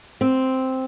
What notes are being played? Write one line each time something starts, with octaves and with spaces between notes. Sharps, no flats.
C4